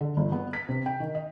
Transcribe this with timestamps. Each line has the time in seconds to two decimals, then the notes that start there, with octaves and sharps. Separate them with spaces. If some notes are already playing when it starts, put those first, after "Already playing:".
0.01 D3
0.17 G1
0.32 B3
0.53 B6
0.69 C3
0.86 G5
1.00 D#3
1.15 D#5